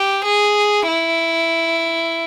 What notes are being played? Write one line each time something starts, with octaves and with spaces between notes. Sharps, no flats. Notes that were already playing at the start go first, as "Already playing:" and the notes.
Already playing: G4
G#4
E4